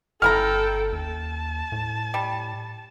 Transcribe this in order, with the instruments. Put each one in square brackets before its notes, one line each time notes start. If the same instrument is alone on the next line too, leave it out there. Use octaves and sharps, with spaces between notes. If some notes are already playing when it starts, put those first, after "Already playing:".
[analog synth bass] G1 [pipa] C#4 E4 A#5 [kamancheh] A4 G5 [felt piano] F6
[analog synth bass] D#2 [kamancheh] A5
[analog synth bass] A2
[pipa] G3